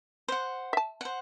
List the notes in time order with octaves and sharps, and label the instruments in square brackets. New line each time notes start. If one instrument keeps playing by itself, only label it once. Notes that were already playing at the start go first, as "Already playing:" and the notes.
[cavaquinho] C5 F#5
[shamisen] E5 A5
[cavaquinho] C5 F#5